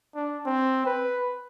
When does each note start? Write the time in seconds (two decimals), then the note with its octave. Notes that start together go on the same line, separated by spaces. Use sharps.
0.15 D4
0.46 C4
0.86 B4